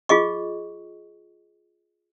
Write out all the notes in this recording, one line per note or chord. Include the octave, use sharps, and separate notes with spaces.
F4 G#4 D#5 C#6